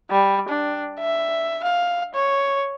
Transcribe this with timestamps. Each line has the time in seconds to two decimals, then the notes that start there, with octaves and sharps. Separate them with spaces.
0.11 G3
0.49 D4
0.99 E5
1.64 F5
2.14 C#5